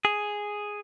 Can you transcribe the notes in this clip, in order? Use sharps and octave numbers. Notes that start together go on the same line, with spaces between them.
G#4